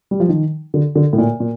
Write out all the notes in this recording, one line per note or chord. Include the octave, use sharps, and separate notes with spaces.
G3
F3
D#3
D3
D3
A2
A#2
A#2